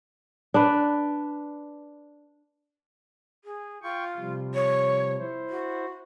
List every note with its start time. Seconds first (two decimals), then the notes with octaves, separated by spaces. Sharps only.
0.54 D4 B4
3.45 G#4
3.83 F4 G5 C#6
4.17 C3 F3 G3
4.54 C#5
5.18 E4 C5
5.50 F#4